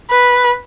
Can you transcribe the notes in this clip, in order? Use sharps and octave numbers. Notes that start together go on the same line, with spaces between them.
B4